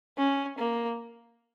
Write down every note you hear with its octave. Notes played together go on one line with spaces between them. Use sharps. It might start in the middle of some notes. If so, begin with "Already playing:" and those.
C#4
A#3